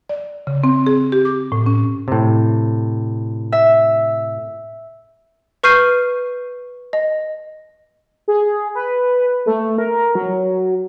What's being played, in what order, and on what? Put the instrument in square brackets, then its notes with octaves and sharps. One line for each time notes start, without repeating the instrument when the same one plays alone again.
[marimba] D5
C#3
C4
G#4
G4
D6
A2
C#4
[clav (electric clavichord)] A2 C3
[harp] E5
[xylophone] B4 C#6 F6 G6 C7 D#7
D#5
[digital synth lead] G#4
B4
A3
A#4
F#3